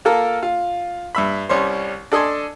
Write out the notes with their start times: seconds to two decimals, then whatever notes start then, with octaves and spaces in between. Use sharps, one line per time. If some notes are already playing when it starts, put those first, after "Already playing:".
0.05 A#3 F4 A4 A#4
0.43 F4
1.15 G2 E5 B5
1.49 C2 G3 C#4 C5
2.12 D4 A4 D#5 G#5 C6